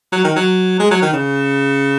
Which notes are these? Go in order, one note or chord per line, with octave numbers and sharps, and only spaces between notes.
F#3
D#3
F#3
G#3
F#3
D#3
C#3